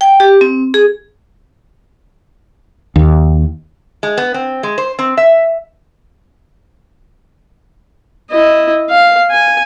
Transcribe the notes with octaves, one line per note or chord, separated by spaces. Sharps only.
G5
G4
C4
G#4
D#2
G#3
B3
C4
G#3
C5
C4
E5
E4 D#5
F5
G#5